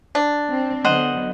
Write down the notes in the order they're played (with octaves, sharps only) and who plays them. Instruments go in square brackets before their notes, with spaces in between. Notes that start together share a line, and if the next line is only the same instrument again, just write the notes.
[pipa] D4
[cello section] C4
[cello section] D3 F#3 B3 [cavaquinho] C5 D#5 F#5